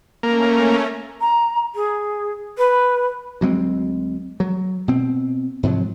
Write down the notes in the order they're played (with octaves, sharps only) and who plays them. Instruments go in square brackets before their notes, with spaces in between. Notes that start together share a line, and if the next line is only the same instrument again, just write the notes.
[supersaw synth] A3 C#4 [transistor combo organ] A#3
[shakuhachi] A#5
G#4
B4
[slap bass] D2 F#3 G#3 C4
F#3
B2 C4
G#2 C3 F3 F#3